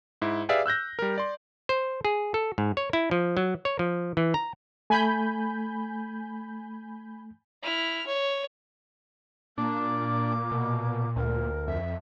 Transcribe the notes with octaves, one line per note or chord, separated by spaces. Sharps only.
G#2 E4
G4 G#4 B4 D5 E5 F5
E6 F#6 G6 A#6
G3 A#4
D5 C6
C5
G#4
A4
G#2
C#5
E4
F3
F#3
C#5
F3
E3
A#5
A3 G#5 B5 G6
E4 F6
C#5
A#2 A#3 D4 D6
B2
D2 A#4
F2 E5